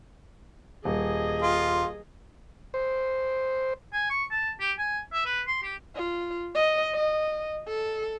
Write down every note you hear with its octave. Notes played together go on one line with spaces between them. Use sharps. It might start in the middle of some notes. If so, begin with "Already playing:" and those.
D#1 G#4 D#5
F4
C5
G#5
C#6
A5
G4
G#5
E5
B4
C6
G4
F4
D#5
D#5
A4